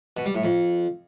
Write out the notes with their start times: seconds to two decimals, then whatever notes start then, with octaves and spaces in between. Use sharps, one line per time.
0.17 B2
0.26 G3
0.35 A2
0.44 F2